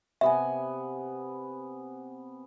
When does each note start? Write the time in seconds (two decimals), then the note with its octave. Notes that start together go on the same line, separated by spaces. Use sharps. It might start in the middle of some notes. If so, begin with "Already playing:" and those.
0.21 C3 B3 E5 G#5